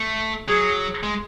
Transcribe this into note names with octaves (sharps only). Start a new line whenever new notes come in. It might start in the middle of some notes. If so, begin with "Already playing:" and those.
Already playing: A3
F#3 G#4
G#3